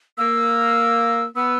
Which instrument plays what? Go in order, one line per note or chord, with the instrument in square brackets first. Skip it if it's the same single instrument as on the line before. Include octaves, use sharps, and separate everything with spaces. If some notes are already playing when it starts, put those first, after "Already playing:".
[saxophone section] A#3 [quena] E6
[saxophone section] B3 [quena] E6